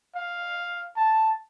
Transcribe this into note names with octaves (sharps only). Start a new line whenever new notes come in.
F5
A5